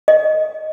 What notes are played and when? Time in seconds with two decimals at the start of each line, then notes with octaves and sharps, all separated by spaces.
0.08 D#5